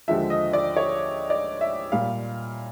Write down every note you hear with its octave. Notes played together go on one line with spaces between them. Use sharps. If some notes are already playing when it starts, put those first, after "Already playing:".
D#2 D3 F3 G#3 E5
D#5
D5
C#5
D5
E5
A#2 G3 F5